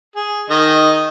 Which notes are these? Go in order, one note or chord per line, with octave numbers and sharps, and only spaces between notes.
G#4
D#3 D#5 D#6